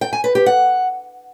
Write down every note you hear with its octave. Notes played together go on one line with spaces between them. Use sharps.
G5
G#5
B4
G4
F#5